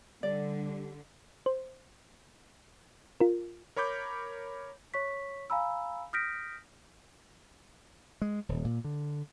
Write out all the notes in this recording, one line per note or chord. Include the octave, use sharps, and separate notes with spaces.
D3 G3 D5
C5
F4 A#4
A#4 C#5 B5 D6 G6
C#5 C#6 B6
F5 G#5 A#5 B5 E6
D#6 F6 G6 A#6 B6 D7
G#3
D#1
A#2
D3